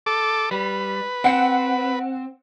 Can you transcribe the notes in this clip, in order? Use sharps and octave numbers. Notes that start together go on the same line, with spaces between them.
A4 D6
G3 B4
C4 F#5 C#7